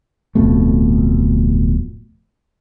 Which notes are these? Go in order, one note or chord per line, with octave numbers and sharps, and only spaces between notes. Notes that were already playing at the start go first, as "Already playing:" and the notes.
D1 F2 B2 A3